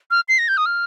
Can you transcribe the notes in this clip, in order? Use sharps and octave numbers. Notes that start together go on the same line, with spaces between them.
F6
C7
A#6
G6
D#6
F6